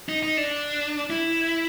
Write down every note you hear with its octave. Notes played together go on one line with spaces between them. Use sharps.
D#4
D#4
D4
E4